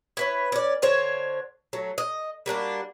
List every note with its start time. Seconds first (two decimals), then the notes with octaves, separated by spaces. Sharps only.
0.17 E4 B4 C#5
0.52 C#4 D5
0.82 D3 C5 C#5
1.73 F#3 A3
1.98 D#5
2.46 G3 A#3 D4 F#4